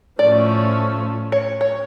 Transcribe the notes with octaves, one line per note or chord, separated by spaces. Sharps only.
A2 F3 A3 C#4 D5
C#5
C#5